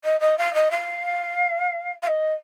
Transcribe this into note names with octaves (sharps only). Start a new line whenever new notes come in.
D#5
D#5
F5
D#5
F5
F5
D#5